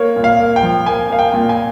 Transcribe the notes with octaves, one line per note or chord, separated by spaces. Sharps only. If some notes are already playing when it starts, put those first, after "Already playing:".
Already playing: A#3 C#5
A#2
F5
A#3
G5
F3
A#3 G#5
A#3 F5
G5
A#2
G#5